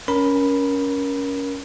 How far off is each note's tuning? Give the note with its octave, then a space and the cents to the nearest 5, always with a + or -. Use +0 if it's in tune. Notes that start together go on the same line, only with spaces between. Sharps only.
C#4 +15 A#4 +20 B5 +0